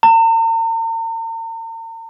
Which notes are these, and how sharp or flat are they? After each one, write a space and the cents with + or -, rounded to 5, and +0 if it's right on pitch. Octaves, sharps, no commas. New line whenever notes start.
A#5 -45